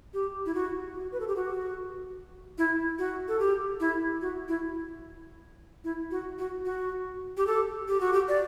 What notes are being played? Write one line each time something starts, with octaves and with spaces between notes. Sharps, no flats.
G4
E4
F#4
F#4
B4
A4
G4
F#4
E4
F#4
A4
G4
E4
F#4
E4
E4
F#4
F#4
F#4
G4
A4
G4
F#4
G4
D5